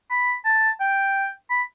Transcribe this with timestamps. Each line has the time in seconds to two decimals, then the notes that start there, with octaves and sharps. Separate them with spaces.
0.10 B5
0.45 A5
0.80 G5
1.50 B5